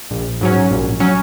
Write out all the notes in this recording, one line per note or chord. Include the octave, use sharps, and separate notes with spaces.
A#1
G#2 F#3 C#4
A#1
F#3 C#4